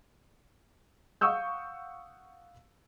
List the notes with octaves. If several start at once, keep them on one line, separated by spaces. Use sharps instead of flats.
F5 F#5 C#6 D#6 E6 G6